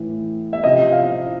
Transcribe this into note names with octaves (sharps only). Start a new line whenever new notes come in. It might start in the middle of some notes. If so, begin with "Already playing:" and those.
Already playing: A2 E3
E5
C3 F3 D#5
F5